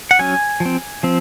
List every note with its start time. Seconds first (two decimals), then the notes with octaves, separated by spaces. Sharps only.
0.11 F#5
0.19 F#3 C#4 G#5
0.60 F3
0.65 C4
1.03 F3 C4